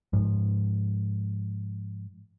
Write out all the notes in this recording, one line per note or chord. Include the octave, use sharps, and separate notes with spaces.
G#2 F3